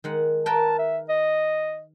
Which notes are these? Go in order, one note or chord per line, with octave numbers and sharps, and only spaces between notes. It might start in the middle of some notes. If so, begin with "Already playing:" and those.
D#3 G#3 F#5
A#4 B4 G5 A5
E5
D#5